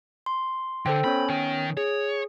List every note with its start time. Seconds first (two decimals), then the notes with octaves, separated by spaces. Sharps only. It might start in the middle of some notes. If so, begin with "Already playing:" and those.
0.26 C6
0.86 D3 A4 C5 G5
1.04 B3 C#4 C#5 B5
1.30 D#3 G5
1.77 G#4 C#5